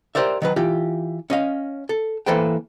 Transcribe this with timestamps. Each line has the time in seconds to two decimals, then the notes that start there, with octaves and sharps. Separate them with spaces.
0.15 G4 A#4 C5 D5 E5
0.42 D#3 F#3 B4
0.56 E3 F4 G4
1.30 C#4 D#5 F5
1.89 A4
2.26 E3 A#3 A4 B4 C5 G5